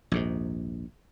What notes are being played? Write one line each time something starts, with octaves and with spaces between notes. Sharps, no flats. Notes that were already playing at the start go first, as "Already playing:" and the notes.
A#1 D#2 G#2